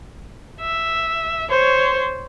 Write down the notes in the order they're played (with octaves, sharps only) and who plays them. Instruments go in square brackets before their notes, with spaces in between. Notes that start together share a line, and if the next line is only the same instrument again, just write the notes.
[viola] E5
C5 C#5